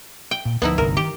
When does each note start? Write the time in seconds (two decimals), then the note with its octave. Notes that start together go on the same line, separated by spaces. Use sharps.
0.31 G5
0.45 A#2
0.62 D2 F3 B3 D#4 E4
0.78 G1 C2 A#4
0.97 D#3 G4